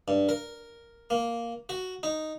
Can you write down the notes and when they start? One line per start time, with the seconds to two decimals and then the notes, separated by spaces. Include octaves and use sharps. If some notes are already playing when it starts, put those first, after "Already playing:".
0.08 G2
0.29 A#4
1.10 A#3
1.69 F#4
2.03 D#4